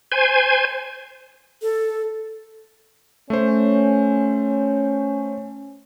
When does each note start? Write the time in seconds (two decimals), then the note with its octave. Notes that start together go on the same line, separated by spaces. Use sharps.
0.12 C5 G#5
1.62 A4
3.30 A3 C#4 C5